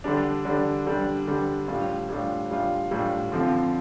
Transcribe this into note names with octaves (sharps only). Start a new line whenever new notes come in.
D3 G3 D4
D3 G3 D4
D3 G3 D4
D3 G3 D4
A2 G3 D4 F4
A2 G3 D4 F4
A2 G3 D4 F4
A2 G3 D4 F4
D3 F3 C4 F4